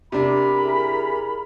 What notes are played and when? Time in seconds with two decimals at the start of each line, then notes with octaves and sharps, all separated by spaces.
0.12 C3 D4 A#4 A#5 B5
0.61 E4 G#4